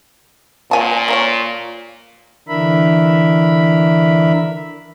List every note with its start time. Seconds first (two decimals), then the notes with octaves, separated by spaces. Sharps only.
0.71 A#2 C#5 G#5 A5
1.08 A#3 F4 C#5
2.48 D3 E3 D4 A#4 E5 B5